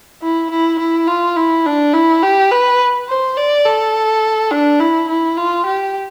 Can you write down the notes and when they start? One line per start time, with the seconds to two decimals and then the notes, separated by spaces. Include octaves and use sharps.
0.22 E4
0.50 E4
0.79 E4
1.08 F4
1.36 E4
1.66 D4
1.94 E4
2.23 G4
2.51 B4
3.08 C5
3.37 D5
3.65 A4
4.51 D4
4.80 E4
5.09 E4
5.37 F4
5.66 G4